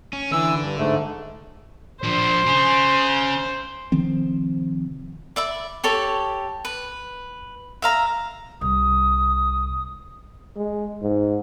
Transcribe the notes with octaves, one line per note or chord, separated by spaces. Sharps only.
C#4
D3 E3 E6
G2
G#2 A3
F3 D4 C5
C#4 G#4
C3 D#3 F3 C4
D5 E5 B5
G4 A4 C#5 B5
B4
E5 F5 A#5
C2 D#6
G#3
G#2